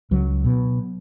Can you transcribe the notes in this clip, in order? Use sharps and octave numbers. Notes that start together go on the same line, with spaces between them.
C#2 F#3
B2